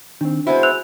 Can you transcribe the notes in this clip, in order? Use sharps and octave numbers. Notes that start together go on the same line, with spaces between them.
D#3 C4 D4
G#3 B3 E4 F#4 G#4 C5
E6 F#6 F7